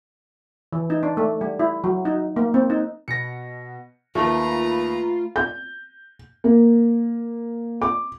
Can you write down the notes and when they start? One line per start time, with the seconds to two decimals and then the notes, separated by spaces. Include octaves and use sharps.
0.72 E3
0.90 D#4
1.03 D4
1.17 A3
1.41 G3
1.59 E4
1.84 F#3
2.05 D#4
2.36 A#3
2.54 C4
2.70 D#4
3.08 B2 A#6 C#7
4.15 D#2 A3 F4 A#4 B4 A#5
5.36 G6
6.44 A#3
7.82 D6